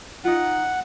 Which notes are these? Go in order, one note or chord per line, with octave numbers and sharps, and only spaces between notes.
D#4 F4 F#5